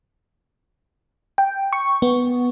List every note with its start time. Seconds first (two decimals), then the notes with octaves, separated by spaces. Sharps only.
1.38 G5
1.73 C#6
2.02 B3